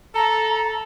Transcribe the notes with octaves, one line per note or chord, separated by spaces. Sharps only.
A4 A#5